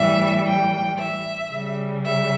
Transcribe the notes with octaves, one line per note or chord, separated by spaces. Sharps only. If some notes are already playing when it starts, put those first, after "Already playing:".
Already playing: A2 E3 G3 E5
G5
E5
C#3 G3
E5